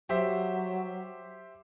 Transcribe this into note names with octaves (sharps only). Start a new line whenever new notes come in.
F#3 G4 C5 E5